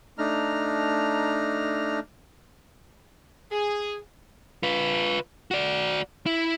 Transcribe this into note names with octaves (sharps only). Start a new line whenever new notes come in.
A3 D4 D#4 A#5 F6
G#4
F4 B4
F#4 D5
E4